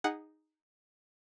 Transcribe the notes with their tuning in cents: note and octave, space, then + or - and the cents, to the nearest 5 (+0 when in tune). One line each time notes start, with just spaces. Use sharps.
D#4 +0 G#4 -20 F#5 +0